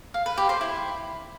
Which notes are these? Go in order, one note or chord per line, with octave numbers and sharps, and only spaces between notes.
F5
B4
G4
C5
E4